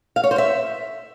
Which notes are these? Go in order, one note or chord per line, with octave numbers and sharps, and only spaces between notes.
F5
C#5
C5
E5